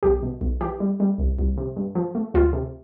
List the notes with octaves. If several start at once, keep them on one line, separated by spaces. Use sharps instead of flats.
B1 G4
B2
B1
E3 G4
G3
G3
C2
C2
C3
G2
F3
A3
D2 F4
C3